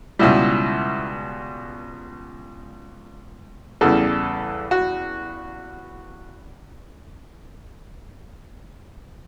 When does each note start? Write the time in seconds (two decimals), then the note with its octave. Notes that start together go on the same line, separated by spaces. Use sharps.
0.19 C#2 B2 G3 E4
3.81 E2 C#3 E3 G3 A4
4.71 F#4